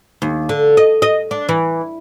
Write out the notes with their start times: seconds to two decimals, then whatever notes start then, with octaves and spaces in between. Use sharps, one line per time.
0.22 D#2
0.49 D3
0.77 D#5
1.02 D#5
1.31 D4
1.49 E3